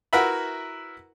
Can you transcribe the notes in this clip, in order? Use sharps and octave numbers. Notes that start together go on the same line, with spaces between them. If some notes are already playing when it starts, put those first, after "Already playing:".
E4 F#4 A#4 B4 E5 B5